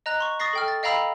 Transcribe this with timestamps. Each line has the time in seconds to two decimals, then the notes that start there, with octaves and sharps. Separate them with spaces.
0.06 D#5 A#5 F#6
0.20 C6 C#6
0.40 C#6 D#6 A6 A#6 C7
0.53 A4 G5 F6
0.68 A6
0.83 D#5 F5 G5 A#5 B5 E6